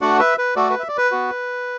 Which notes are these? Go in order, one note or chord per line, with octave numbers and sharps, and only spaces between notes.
A3 D4 F#4 D5 F#5
B4 E5
B4
A3 F#4 A4 D5
B4
E5
D5
B4
B3 F#4